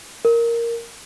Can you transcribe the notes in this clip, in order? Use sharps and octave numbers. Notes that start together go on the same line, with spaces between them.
A#4